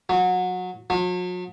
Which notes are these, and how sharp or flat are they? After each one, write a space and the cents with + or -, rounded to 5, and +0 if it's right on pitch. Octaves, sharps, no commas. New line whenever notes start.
F#3 -25
F#3 -45